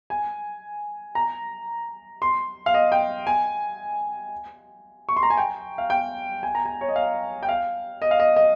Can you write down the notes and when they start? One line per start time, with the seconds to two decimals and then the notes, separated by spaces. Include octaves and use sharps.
0.10 G#5
1.15 A#5
2.22 C6
2.66 F5
2.74 D#5
2.92 G5
3.27 G#5
5.09 C#6
5.17 C6
5.23 A#5
5.30 G#5
5.37 G5
5.78 F5
5.90 G5
6.43 G#5
6.55 A#5
6.65 G#5
6.81 C#5
6.89 D#5
6.96 F5
7.43 G5
7.49 F5
8.02 D#5
8.11 F5
8.20 D#5
8.36 D#5